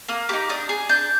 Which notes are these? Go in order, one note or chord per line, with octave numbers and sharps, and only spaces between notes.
A#3 D#6
D#4 G4 D6
D4 D#6
G#4
D4 G6